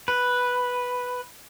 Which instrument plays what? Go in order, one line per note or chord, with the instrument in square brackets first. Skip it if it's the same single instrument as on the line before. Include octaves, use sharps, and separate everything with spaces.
[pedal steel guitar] B4